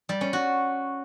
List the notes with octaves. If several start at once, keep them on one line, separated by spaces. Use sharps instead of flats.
G3
C#4
F#4